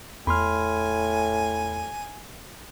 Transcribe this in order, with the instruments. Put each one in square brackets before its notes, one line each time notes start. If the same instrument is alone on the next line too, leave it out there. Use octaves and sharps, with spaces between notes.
[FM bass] E2 [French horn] A2 [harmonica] G#5 [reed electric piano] B5 C6 F6